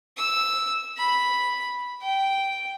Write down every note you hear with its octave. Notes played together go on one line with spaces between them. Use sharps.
E6
B5
G5